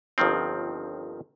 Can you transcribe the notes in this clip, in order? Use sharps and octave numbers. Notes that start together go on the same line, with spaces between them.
G1 D#2 D#3 F3 C4